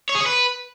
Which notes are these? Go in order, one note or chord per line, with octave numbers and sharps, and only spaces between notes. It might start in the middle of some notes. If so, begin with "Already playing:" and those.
C#5
G#4
C#5
B4